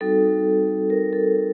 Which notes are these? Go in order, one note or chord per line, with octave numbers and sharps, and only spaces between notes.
G3 C4 D#4 F#4 A4
A#4
A4